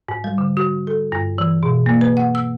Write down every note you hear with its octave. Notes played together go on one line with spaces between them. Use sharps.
G#2
G3
D3
F#4
A4
G2
E3
B2
A#3
B4
F#5
E6